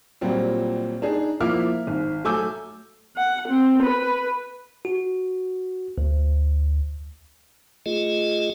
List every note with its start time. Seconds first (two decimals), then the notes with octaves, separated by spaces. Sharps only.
0.21 A#2 F#3 G3 C4 F4
1.02 D4 D#4 G#4
1.41 F3 A#3 E4 E5 D6 F6
1.87 G#1
2.24 F#3 A3 G#5 D6 E6 G6
3.17 F#5
3.49 C4
3.83 B4
4.85 F#4
5.98 D2
7.86 A3 F4 G#4 D#5